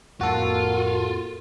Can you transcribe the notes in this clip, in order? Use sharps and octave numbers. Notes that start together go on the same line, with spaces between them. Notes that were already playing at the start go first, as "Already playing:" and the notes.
F2 A2 A#3 F4 F#4 A4